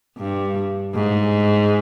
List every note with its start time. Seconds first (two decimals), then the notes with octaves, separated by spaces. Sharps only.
0.18 G2
0.94 G#2